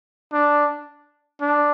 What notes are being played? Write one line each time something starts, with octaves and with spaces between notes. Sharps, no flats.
D4
D4